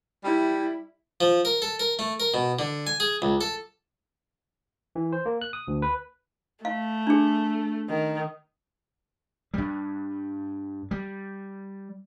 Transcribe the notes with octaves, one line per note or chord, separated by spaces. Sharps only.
G3 E4
F3
A#4
A4
A#4
A3
A#4
B2
D3
G#5
G#4
C#2
A4
E3
C5
A#3
F#6
D#6
D2
B4
A3 F5
D4 G#4
D#3
G2 G3
G3